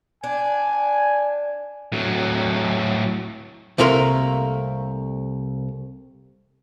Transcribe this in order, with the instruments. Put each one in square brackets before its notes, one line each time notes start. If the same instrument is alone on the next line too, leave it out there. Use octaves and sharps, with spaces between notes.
[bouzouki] D4 [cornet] G#5
[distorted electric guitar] A2 F#3
[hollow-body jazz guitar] C2 C3 A3 A#3 A#4 C6